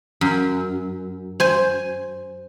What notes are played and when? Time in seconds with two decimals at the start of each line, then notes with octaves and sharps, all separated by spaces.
0.21 F#2
1.40 C5 G#5